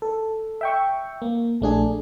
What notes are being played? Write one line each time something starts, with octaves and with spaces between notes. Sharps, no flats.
A4
E5 G5 C#6
A#3
A#1 A3 D4 G#4